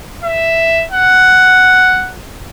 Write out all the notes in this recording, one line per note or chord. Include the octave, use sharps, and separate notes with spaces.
E5
F#5